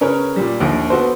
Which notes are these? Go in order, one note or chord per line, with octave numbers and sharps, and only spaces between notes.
C#3 C#4 A#4 B4 C#5
A#2 G3
A#1 D#2
B3 F#4 A4 C5